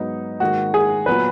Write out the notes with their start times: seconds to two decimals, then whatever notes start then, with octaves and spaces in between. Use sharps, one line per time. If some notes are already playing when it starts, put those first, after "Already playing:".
Already playing: G#2 F#3 B3 D#4
0.40 G#2 D#3 A#3 F#4
0.74 G#4
1.06 A#2 F#3 B3 B4